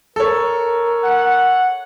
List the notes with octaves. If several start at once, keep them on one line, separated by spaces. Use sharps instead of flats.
A4 A#4 C#5
F#5